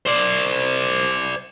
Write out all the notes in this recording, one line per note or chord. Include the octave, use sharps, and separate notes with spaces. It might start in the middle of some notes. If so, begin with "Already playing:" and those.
C5 D5